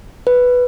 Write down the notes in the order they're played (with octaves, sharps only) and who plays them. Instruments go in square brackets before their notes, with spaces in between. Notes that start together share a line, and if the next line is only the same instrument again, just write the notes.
[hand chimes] B4